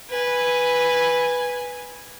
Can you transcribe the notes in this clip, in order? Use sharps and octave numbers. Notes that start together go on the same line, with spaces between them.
B4 G#5